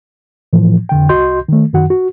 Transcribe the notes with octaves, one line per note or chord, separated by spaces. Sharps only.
A2 E3 F3
F2 D3 G5
C2 F#4 D#5 C6 G6
D#3 A3
F#2 D#3 F#4 F#5
F#4